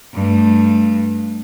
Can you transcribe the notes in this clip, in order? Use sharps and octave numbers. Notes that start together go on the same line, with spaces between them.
G2 A3